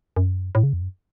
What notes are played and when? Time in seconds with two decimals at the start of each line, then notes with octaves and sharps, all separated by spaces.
0.16 F#2
0.55 A2
0.63 C#3
0.73 F2
0.82 F#2